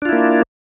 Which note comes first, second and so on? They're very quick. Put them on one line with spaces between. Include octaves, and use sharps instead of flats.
D4 F4 E4 A#3